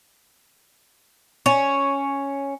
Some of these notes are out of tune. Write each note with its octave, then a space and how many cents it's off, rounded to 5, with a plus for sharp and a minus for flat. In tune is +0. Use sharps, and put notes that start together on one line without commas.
C#4 +0 C#5 +0